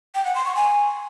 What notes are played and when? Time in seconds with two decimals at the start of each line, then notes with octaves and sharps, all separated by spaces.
0.15 G5
0.25 F#5
0.35 C6
0.45 C#6
0.56 G#5